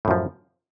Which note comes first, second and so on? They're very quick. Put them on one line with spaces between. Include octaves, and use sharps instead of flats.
A2 F#2 F3